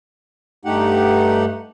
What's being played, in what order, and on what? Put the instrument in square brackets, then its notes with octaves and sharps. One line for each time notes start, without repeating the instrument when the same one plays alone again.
[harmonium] G2 A3 D#4 G4 F#5